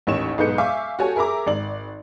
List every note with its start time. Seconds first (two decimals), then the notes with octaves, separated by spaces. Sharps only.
0.07 A1 D#2 C#5 C#6 E7
0.38 B1 G#2 B4 D#5 G6 C#7
0.58 E5 F5 G#5 C#6 D6
0.99 F#4 G4 A4 C#5 G#5
1.16 G#4 A#4 E5 A#5 D6
1.46 G#1 D5 F#7